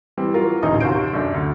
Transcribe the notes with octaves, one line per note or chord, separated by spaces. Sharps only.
E3 G3 C4
E3 F#3 F4 A#4
D#1 A1 D2 D#4 E5 D#6
D#2 C3 F#4 C5 G6 D7
F#2 D4 A4
D2